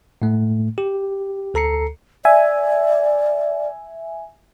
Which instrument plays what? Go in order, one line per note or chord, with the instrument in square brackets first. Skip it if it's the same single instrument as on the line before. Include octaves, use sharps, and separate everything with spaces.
[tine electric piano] A2 A3
G4
D2 A4 A#5 C7 C#7
[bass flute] D5 [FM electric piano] E5 G#5